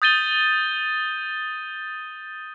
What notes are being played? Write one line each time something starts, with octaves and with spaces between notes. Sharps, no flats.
D#6 G6 A6 D#7 G7